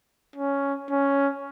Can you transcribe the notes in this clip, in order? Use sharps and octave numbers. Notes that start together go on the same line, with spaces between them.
C#4
C#4